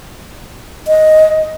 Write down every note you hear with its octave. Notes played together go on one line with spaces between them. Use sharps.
D#5